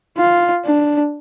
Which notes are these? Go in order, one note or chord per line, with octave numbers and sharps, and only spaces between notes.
F4
D4